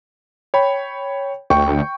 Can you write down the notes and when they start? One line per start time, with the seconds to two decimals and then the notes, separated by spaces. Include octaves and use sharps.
0.54 C#5 G5 B5
1.50 D2 G5 C#6